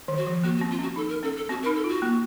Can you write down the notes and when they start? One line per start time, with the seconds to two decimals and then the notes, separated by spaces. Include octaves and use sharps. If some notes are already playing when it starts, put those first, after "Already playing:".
0.08 D#3
0.17 F#4
0.26 F3
0.44 A#3 F#4
0.57 F#4
0.61 C4
0.71 F4
0.79 C#4 F#4
0.96 D#4 A4
1.09 A#4
1.23 C#4 A4
1.37 A4
1.49 C4 F#4
1.63 A#4
1.66 D#4
1.76 A4
1.84 F4 F#4
2.02 A#3